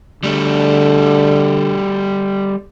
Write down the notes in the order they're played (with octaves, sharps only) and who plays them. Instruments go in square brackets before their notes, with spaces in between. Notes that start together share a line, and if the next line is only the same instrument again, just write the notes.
[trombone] D3 [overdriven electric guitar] G3 A3